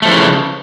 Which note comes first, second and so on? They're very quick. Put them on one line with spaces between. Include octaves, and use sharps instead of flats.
A3 F3 E3 C#3